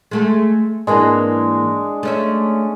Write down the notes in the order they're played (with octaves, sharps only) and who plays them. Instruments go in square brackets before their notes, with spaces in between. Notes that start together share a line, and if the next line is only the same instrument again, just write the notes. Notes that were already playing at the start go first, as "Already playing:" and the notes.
[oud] G#3 A3 A4
[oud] G#2 E3 A#3 [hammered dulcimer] G#3 D4
[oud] A3 C#4 E5